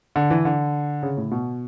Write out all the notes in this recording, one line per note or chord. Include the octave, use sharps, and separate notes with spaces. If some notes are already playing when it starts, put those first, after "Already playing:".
D3
E3
D3
C#3
A2
B2